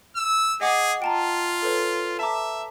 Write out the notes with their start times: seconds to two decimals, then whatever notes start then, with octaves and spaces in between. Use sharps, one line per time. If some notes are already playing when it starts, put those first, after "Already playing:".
0.16 E6
0.61 G#4 D#5 F#5 D6
1.02 F4 G5 A5 A#5
1.62 A4 B4 C#5
2.19 E5 A5 A#5 D6